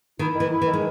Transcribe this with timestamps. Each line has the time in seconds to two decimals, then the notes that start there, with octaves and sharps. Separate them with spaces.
0.19 D#3 E4
0.35 D#3
0.40 E3
0.51 E4
0.61 E3
0.67 D#3
0.73 G#3